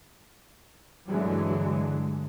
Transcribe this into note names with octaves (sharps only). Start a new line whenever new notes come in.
G2 D3 E3 F#3 G#3